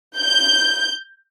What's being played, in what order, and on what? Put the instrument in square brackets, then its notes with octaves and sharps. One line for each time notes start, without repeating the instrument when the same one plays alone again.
[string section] G6